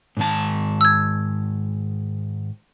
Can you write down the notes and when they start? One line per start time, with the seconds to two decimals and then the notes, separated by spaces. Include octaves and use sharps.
0.17 G#2 D#3 A5
0.81 E6 G#6